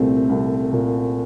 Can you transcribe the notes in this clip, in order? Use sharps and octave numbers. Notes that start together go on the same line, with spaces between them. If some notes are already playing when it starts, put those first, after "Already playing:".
Already playing: C2 A#2 A3 C4
C2
A#2